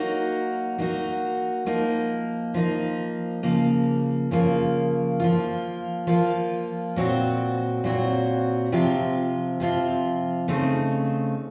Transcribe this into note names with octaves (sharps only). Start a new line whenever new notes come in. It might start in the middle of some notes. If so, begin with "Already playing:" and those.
Already playing: F#3 A#3 D#4 F#4
F#3 A#3 D#4 F#4
F3 A#3 D#4
F3 A#3 D#4
C#3 F3 A#3
C#3 F3 A#3
F3 A#3 F4
F3 A#3 F4
A#2 F#3 C4 F#4
A#2 F#3 C4 F#4
C3 F3 C4 F4
C3 F3 C4 F4
C#3 A3 C4 D#4